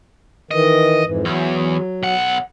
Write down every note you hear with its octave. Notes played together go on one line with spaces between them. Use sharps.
D#3 E3 D#5
F2 G#2 E3
E2 F#3
B1 F#5